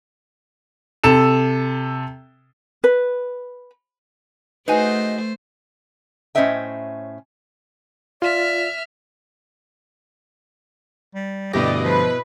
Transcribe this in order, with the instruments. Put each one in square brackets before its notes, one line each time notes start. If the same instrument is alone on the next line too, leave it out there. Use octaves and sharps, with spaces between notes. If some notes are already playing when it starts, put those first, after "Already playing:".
[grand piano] C3 A4 E7
[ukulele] B4
[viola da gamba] A3 C5 [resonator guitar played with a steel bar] D#4 F#4 G#4 [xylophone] B4 G#5 [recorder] D#5
[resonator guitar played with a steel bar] A2 C#4 C5 D#5 E5 G5
[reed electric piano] F4 [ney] D5 [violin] E5 F6
[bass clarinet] G3
[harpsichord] D2 G2 [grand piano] B2 E4 A#6 [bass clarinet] G4 [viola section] D5 D#5
[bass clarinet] F3 [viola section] B4